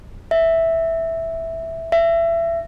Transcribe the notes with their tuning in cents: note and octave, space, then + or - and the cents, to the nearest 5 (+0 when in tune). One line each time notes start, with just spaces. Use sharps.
E5 -5
E5 +25